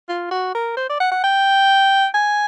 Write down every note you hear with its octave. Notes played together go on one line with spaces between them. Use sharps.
F4
F#4
A#4
C5
D5
F#5
F#5
G5
G#5